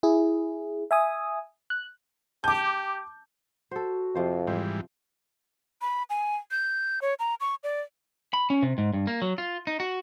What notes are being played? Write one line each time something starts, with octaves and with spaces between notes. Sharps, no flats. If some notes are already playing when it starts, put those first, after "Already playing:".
E4 G#4
E5 G#5 D#6
F#6
G4 A5 D6 G6
F#4 A4 C5
F2 C3 F3 C5
G#2 E3 G3 C5
B5
G#5
G6
C#5
A#5
C#6
D5
B5
C#4
C3
G#2
G2
A#3
F#3
F4
D#4
F#4